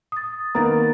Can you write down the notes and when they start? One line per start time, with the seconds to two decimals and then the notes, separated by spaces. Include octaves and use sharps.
0.12 D#6 A6
0.55 D#3 A#3 B3 A#5 A6